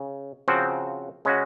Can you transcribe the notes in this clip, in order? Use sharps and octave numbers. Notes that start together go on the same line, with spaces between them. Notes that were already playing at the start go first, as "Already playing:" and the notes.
Already playing: C#3
C#3 F3 C4 F#4
C#3 G#3 C#4 F#4